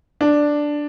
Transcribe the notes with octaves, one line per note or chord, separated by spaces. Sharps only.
D4